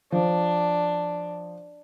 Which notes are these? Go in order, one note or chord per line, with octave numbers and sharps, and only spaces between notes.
F3 D4